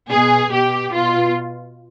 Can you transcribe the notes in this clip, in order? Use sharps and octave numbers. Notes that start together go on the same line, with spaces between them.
B2 G#4
B2 G4
B2 F4